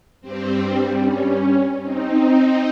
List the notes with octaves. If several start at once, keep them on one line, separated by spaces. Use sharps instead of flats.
G2 G3 C4
C#4
C4 D#4